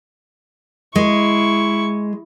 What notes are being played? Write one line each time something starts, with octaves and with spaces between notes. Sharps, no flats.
G#3 E4 C#6